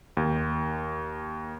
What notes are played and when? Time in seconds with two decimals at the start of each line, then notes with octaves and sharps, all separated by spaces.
0.17 D#2